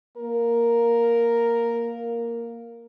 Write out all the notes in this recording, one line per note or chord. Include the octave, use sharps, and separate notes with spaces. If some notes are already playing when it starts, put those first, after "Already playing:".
A#3 A#4